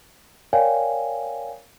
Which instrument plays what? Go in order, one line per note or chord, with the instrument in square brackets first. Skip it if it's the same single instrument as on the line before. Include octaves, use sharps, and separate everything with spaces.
[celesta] A#4 C#5 D5 F5 G5 G#5